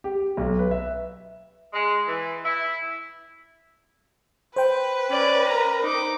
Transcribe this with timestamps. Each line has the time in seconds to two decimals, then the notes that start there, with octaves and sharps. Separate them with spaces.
0.04 G4
0.37 B1
0.59 B4
0.71 E5
1.74 G#3
2.08 E3
2.45 E4
4.56 B4 C5 G5
5.09 C#4 D5
5.47 A#4 A#5
5.82 D#4 D6